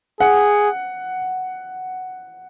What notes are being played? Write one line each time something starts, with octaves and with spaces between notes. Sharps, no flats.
G#4 F#5